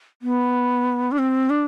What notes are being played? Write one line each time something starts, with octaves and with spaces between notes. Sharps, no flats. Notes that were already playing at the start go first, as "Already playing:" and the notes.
B3
D4
C4
D4